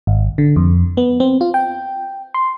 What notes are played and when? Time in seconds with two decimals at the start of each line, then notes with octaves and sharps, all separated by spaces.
0.07 G#1
0.38 D3
0.56 F2
0.97 B3
1.20 C4
1.41 F4
1.54 G5
2.34 C6